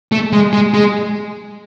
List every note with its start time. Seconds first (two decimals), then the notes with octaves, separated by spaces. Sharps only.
0.12 A3
0.33 G#3
0.53 G#3
0.74 G#3